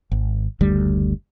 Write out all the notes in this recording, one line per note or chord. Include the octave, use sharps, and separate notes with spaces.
G#1
F#1 D2 G3